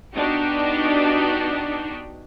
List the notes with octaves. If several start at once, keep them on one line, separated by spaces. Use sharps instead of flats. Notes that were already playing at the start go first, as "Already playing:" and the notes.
B3 D4 D#4 F#4 G4